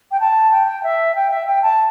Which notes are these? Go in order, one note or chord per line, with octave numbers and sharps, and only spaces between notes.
G5
A5
G5
E5
G5
E5
G5
A5